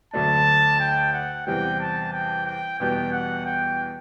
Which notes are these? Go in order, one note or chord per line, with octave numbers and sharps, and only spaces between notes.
D2 D3 F#3 A3 D4 A5
G5
F#5
E2 C3 E3 G3 G5
A5
G5
G5
E2 B2 G3 B3 G5
F#5
G5